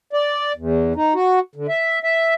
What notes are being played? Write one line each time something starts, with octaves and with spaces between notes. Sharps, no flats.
D5
E2
D#4
F#4
D3
E5
E5